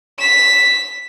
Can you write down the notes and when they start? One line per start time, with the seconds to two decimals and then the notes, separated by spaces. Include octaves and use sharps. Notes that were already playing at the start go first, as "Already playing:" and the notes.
0.20 B6 E7